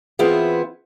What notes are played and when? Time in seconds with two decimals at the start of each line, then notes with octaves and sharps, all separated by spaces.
0.19 E3 B3 C4 E4 F4 G#4